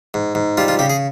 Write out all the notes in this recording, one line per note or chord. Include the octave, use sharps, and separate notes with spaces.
G#2
G#2
G3 F4
F4
C#3 G4
G#4